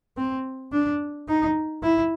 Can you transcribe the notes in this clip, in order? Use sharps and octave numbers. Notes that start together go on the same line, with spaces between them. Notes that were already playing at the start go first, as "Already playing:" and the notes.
C4
D4
D#4
E4